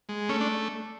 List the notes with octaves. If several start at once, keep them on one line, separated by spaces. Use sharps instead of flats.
G#3
A3 C#4
D4